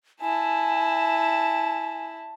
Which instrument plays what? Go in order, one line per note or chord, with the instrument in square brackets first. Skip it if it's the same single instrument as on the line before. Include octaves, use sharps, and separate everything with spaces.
[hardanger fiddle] E4 A5 [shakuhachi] G#5